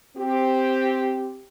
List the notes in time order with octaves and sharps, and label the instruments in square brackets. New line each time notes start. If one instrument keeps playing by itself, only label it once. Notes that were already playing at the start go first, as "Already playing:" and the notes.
[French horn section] C4 G4